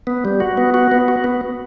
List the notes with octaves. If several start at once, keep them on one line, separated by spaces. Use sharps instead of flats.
B3
G3
F#4
B3
F#4
B3
F#4
B3